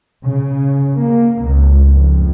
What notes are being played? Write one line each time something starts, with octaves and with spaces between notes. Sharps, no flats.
C#3
A#3
C#2
F2